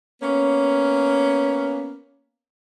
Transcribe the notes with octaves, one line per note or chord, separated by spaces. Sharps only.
A#3 B3 C#4